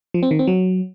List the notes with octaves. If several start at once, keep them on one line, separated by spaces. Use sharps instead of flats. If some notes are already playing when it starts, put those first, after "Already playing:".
F3
C4
D#3
C4
F#3